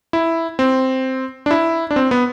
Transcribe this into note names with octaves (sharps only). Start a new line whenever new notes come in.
E4
C4
D4
E4
D4
C4
B3